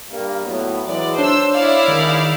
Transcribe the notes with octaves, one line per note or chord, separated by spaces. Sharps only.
G2 G3 A#3
A2 F#3 B3
E3 F#3 G#3 D5
D4 C5 C#5 E6
E4 D5 F5
D2 D#3 G#3 D#4